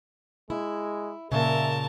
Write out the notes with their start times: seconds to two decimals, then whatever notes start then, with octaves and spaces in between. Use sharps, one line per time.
0.50 G#3 E4
1.32 A#2 C#3 A#4 E5 A5